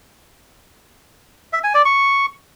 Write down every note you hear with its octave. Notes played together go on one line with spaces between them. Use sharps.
E5
G#5
D5
C#6